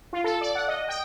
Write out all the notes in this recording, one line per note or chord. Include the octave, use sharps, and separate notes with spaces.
F4
A4
D5
F#5
D#5
G5